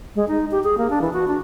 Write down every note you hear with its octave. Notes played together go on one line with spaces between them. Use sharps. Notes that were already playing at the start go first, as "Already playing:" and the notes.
G#3
D#4
G4
G#4
A#3
D4
E3
F#4
D4